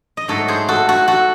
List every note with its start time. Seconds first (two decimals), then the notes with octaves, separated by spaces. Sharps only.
0.17 D#5
0.28 G#2 F#3 A3 A4 C#5
0.48 G#4 C5
0.68 F#4 A4
0.89 F#4 A4
1.08 F#4 A4